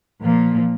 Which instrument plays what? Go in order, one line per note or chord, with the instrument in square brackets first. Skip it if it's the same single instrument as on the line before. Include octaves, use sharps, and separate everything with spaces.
[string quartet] A#2 F3 A#3